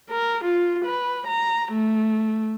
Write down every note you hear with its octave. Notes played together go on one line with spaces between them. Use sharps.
A#4
F4
B4
A#5
A3